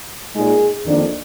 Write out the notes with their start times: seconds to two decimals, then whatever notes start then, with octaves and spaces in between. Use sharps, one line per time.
0.35 A#2 G#3 D#4 G#4
0.85 F2 D#3 A#3 D4